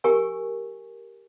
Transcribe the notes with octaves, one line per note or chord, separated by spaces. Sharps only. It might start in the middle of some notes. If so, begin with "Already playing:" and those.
G4 A#4 G#5 C#6